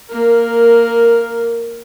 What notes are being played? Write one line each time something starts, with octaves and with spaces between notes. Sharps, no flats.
A#3 A#4